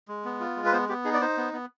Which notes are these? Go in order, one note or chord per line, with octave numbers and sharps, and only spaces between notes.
G#3
B3
F4
G#3
B4
B3 C5
B3 G4
D#4 G#4
D5
D#4 C5
B3
B3